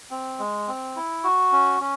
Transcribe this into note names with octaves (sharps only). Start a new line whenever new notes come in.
C4
G#3
C4
E4
F#4
C#4
C#4